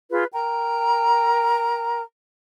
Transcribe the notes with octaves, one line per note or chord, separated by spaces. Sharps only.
F4 G#4 B4
A#4 G5 A#5